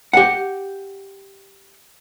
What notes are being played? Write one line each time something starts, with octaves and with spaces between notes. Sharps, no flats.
G4 F#5